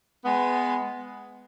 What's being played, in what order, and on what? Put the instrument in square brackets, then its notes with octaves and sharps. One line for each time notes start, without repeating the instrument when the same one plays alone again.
[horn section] G#3 B3